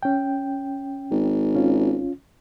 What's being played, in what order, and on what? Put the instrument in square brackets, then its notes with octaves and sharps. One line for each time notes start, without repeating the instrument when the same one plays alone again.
[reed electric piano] C#4 G5
[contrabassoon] G#1
[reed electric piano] C#4 F4